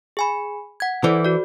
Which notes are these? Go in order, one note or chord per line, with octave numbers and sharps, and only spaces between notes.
G#4 G#5 B5
F#5 G#6
E3 A4 C5 D5
F#4 D5